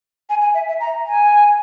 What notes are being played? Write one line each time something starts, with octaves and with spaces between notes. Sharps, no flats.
G#5
G#5
E5
E5
A#5
G#5